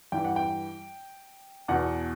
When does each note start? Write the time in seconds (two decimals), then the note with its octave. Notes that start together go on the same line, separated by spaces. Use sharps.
0.12 G2 E3 G5
0.25 F#5
0.36 G5
1.68 E2 B2 F#5